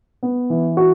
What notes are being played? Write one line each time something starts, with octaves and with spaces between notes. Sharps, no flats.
B3
E3
F#4